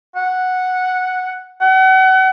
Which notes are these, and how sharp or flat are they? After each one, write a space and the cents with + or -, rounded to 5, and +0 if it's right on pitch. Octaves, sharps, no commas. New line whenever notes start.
F#5 -5
F#5 +35